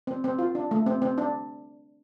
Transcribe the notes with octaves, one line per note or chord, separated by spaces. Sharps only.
C4
C4
F4
D4
A3
C4
C4
D4